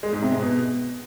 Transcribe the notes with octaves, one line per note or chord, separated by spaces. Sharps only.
G#3
G#2
C3
G#3
B2